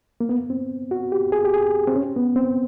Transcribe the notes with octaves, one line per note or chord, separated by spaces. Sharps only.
A#3
B3
C4
F#4
G4
G#4
G4
G#4
C4
C#4
B3
C4